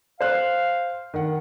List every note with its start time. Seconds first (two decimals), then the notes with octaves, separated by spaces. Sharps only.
0.21 C5 F5 F#6
1.14 D#3 F#5